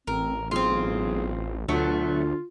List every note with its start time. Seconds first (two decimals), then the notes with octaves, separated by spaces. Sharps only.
0.07 A1 C4 A#4
0.51 B1 C4 F4 G#4
1.68 D2 B2 D3 F#3 A3 F4